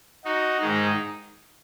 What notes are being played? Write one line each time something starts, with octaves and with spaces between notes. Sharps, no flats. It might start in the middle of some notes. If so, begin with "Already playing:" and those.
D#4 F#4
G#2 D#3 G#3 D#4